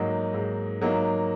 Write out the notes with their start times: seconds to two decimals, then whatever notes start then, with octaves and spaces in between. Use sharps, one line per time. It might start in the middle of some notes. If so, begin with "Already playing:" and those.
Already playing: G#2 F#3 A#3 D#4
0.34 G#2
0.82 F#3 A#3 D#4